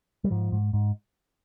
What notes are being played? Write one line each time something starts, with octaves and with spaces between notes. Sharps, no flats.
G3
G#2 F3
G#2
G#2